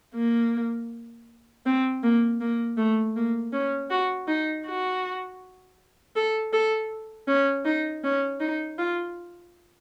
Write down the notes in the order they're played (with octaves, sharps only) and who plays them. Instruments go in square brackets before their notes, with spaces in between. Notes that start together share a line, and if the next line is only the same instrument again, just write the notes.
[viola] A#3
C4
A#3
A#3
A3
A#3
C#4
F#4
D#4
F#4
A4
A4
C#4
D#4
C#4
D#4
F4